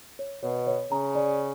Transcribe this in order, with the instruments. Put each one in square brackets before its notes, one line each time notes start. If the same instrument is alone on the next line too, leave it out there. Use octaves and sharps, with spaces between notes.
[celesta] C#5
[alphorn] B2 [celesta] C#5
[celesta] C#5
[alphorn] C#3 [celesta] A#5
[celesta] D5